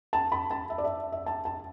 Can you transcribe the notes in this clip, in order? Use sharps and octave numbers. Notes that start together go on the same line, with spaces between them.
A5
B5
A5
E5
D5
E5
E5
A5
A5